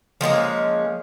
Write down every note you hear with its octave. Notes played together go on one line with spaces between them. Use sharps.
F3 G#3 A#3 C#4